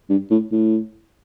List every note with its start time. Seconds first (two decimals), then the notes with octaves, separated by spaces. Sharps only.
0.10 G2
0.31 A2
0.52 A2